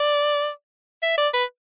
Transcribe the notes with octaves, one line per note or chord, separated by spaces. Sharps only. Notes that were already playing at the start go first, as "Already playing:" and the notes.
Already playing: D5
E5
D5
B4